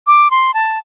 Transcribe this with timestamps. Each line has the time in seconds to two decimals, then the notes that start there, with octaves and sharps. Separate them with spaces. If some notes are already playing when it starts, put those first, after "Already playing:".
0.07 D6
0.31 C6
0.54 A5